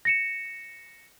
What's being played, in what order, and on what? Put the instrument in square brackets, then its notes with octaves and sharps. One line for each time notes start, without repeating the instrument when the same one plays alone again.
[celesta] A#6 C#7 E7